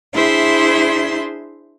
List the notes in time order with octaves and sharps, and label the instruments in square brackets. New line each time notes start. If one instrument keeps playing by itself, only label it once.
[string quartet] D4 E4 G#4 C5 E5 C6